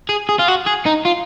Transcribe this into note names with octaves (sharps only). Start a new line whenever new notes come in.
G#4
G#4
F4
F#4
G#4
D#4
F4